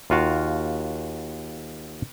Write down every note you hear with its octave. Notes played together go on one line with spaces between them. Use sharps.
D#2 F4 F#4 F5